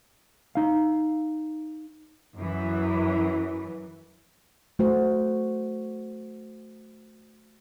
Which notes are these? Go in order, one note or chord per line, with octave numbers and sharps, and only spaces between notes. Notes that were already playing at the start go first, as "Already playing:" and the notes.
D#4 F5
F#2 E3
A3 F#4 C5